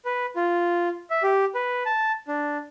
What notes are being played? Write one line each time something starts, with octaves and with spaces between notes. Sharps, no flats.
B4
F4
E5
G4
B4
A5
D4